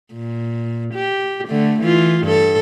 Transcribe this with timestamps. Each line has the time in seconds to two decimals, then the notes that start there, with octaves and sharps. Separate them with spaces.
0.13 A#2
0.94 G4
1.48 D3 A3
1.82 E3 F4
2.25 G2 A4